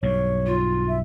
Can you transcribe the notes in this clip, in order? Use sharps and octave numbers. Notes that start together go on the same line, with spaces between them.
B1 G2 C#5
F4
E5